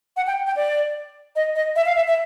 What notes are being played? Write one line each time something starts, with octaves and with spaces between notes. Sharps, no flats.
F#5
G5
G5
D5
D#5
D#5
E5
F5
E5
E5